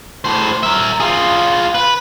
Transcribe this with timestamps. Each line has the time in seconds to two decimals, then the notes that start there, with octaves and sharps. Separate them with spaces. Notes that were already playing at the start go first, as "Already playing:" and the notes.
0.25 A2 C5
0.63 A#4 E5
1.00 F4 G#4
1.75 B4